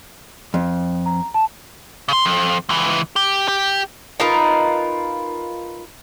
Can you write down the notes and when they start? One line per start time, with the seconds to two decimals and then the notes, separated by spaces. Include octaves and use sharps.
0.54 F2
1.06 A#5
1.34 A5
2.08 C#3 C6
2.25 F2
2.69 C#2 E3
3.16 G4
3.48 G4
4.20 D#4 F4 A#4 B4